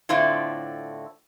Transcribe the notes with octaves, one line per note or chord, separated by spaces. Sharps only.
A2 D3 C4 E4 F4